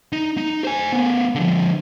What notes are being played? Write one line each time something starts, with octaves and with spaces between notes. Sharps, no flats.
D#4
D#4
C5 G#5
A3 B3
D3 F3